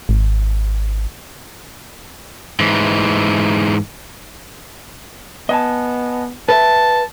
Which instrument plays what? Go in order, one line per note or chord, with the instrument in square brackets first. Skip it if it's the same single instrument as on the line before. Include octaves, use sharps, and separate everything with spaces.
[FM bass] G#1
[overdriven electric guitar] G#2 E3
[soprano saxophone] B3 [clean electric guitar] D#5 G#5 A5
[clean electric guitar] B4 E5 [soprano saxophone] A5